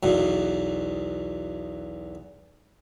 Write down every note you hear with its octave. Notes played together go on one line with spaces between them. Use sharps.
B1 E2 B2